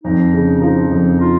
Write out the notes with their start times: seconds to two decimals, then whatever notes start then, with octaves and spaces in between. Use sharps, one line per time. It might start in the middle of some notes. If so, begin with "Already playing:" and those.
0.04 F2 D#4
0.33 C#3
0.61 F3 D#4
0.91 F2
1.20 F4